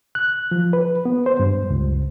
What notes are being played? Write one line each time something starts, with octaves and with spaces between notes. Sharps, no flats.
F#6
F3
B4
B3
C5
G2
C#2